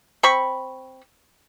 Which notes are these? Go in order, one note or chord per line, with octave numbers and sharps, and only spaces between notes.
C4 B5 C#6